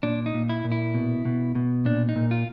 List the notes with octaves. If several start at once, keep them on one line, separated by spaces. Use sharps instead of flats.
A#2 D4
D#4
A#2
E4
A#2
E4
B2
B2
B2
A#2 D4
D#4
A#2
F4